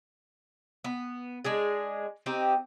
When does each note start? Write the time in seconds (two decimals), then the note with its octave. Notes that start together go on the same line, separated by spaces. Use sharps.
0.84 B3
1.44 G#3 D4 G#4
2.26 C4 D#4 G4 C5